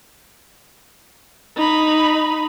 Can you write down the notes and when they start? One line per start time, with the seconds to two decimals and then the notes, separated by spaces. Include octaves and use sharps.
1.56 D#4 B5